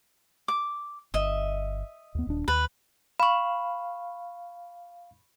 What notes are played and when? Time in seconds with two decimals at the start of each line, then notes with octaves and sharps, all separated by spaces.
0.48 D6
1.14 G1 D#5 E5
2.15 D#2 B3
2.27 D#1 D4
2.48 D#2 B4
3.20 F5 B5 C#6